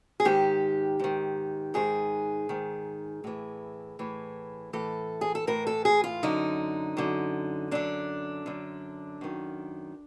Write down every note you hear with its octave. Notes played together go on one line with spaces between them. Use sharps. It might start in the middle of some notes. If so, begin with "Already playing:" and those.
G#4
G#2 D#3 G4
G#2 D#3
G#2 D#3 G#4
G#2 D#3
A2 E3
A2 E3
A2 E3 A4
G#4
A4
A2 E3 A#4
A4
G#4
F4
F#2 D3 D#4
F#2 D3
F#2 D3 D4
F#2 D3
F#2 D#3